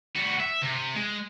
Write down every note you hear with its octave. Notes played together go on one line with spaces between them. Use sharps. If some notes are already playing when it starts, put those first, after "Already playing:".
G3 F#4
E5
C3
G#3